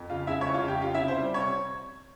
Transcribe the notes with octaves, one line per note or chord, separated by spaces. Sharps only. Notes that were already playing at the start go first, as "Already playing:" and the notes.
Already playing: F2
C#3 F4 F5
G#3 E4 E5
F2 C#5
F4 F5
C#3 G4 G5
C#4 F4 F5
E4 E5
C3
C5
G3
C3 C#5